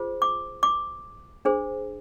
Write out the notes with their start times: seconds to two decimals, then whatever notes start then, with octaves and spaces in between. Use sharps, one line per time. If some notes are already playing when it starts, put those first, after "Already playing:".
Already playing: F4 G#4 C5
0.22 D6
0.63 D6
1.45 D4 G#4 C5